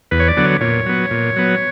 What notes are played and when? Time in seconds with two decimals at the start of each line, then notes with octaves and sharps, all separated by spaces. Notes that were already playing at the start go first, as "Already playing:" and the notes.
0.11 E2 B4
0.20 C#5
0.28 D5
0.37 D3 F#3 B3
0.44 C#5
0.61 A#2 C#5
0.86 F#3 B3
1.11 A#2
1.36 F#3 B3